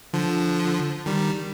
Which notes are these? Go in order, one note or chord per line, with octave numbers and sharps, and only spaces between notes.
D3 F3
D#3 G3